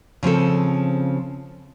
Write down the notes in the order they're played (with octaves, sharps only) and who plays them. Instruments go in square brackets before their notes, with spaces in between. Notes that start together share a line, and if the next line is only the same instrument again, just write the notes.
[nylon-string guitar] C#3 F3 C4 A4